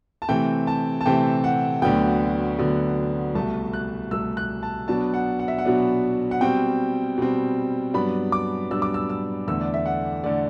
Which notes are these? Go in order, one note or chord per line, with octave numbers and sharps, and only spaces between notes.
A5
C3 E3 A3 C4 G5
A5
A5
C3 E3 A3 C4 G5
F#5
D2 D3 F#3 B3 G5
D2 D3 F#3 B3
C2 B2 A3 A5
F#6
C2 B2 A3 E6
F#6
A5
B2 F#3 B3 D4 A5
F#5
F#5
E5
F#5
B2 F#3 B3 D4
F#5
B2 G3 C4 G5
B2 G3 C4
G2 F#3 B3 D4 B5
D6
G2 F#3 B3 D4 E6
D6
E6
E6
E2 D3 A3 E6
D5
E5
F#5
D3 A3 D5